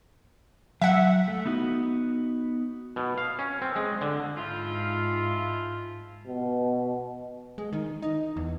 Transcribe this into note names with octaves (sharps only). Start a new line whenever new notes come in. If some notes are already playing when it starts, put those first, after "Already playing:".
F#3 E5 F#5
A3
B3 D#4 F#4
B2
F5
C#4
C4
G#3
D3
G#2 F3 E4 F4
B2
G#3
D#3
D#4
E2